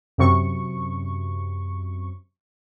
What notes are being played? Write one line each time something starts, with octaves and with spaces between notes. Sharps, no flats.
F#2 C3 C#6